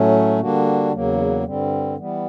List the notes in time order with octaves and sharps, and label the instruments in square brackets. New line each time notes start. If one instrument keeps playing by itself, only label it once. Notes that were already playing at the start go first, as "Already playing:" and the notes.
Already playing: [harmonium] A2 F#3 A3 C#4
D3 G3 A#3 D4 F#4
E2 C#3 F#3 A#3
G2 D3 G3 C4
E3 G3 B3